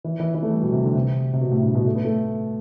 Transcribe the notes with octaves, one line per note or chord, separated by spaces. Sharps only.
E3
E3
E3
A3
G3
B2
C3
D3
C3
C3
B2
A2
G2
B2
A3
B3
A3